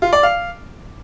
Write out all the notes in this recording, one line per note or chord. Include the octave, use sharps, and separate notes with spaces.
F4
D5
F5